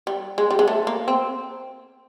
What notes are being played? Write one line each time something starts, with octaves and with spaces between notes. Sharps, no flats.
G3
G#3
G3
G#3
A3
A#3
C4